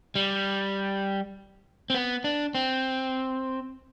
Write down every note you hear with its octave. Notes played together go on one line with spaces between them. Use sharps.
G3
C4
B3
D4
C4